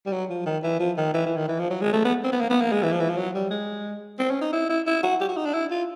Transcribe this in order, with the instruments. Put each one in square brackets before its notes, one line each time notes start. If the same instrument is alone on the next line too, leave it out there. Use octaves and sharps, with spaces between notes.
[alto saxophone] G3
F#3
F3
D#3
E3
F3
D#3
E3
E3
D#3
E3
F3
F#3
G#3
A3
B3
C4
B3
A#3
B3
A#3
G#3
E3
F3
E3
F3
F#3
G3
G#3
C4
C#4
D#4
E4
E4
E4
F#4
G4
F#4
D#4
D4
E4
F4